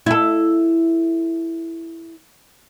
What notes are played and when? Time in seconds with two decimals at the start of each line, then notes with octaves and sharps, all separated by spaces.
0.06 E4 A4